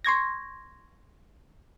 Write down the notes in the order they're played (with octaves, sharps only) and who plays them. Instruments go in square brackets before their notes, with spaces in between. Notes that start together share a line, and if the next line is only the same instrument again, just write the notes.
[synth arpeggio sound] C6 C#6 G#6 A#6